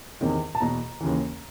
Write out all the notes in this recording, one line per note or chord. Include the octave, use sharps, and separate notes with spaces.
E2 C3 D#3
A5
E2 B2 A#5
D#2 C#3 E3